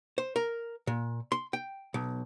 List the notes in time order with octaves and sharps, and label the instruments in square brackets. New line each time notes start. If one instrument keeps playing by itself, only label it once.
[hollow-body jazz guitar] C5
A#4
A#2
C6
G5
B1